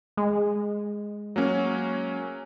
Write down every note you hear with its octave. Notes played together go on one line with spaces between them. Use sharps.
G#3
F#3 A#3 C#4